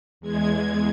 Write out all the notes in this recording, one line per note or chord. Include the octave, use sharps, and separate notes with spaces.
E2 G#3 G#6